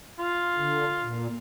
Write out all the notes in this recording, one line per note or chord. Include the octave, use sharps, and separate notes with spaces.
F4
D3
A#2